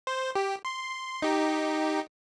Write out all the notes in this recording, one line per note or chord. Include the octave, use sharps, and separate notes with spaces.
C5
G4
C6
D#4 G4